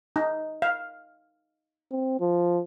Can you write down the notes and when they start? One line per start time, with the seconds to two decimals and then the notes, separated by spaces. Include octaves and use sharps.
0.16 D#4
0.62 F5
1.91 C4
2.20 F3